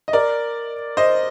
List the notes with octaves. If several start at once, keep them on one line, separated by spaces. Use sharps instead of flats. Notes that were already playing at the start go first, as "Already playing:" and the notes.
D#5
A#4 D5
C5 D#5